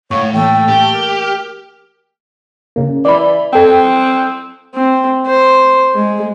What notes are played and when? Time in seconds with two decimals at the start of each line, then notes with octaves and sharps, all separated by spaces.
0.11 A2 A3 C#5 F5 C#6
0.33 E3 A3 A#3 G5
0.68 G4
0.93 A#4
2.76 C#3 A#3
3.05 E3 D5 B5
3.53 C4 A4 G5
4.75 C4
5.27 C5
5.95 G#3